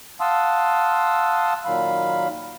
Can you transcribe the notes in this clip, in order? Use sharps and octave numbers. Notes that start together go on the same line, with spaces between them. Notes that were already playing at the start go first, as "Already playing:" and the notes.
F5 F#5 A5 C6 D#6 E6
A#2 D#3 F#3 F5 B5